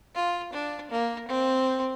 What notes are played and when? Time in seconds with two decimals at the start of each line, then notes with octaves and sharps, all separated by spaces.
0.15 F4
0.53 D4
0.91 A#3
1.29 C4